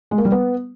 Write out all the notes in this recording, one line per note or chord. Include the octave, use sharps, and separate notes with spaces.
G#3
A#3
G3
B3